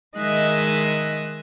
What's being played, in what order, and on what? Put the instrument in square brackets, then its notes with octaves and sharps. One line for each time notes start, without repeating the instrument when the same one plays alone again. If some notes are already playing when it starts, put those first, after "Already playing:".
[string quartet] D#3 G#3 D#5 E5 F#6